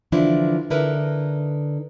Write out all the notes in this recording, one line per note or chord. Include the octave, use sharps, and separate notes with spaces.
D3 E3 F3 D4 E4 F4
D3 D#4 E4 A#4 B4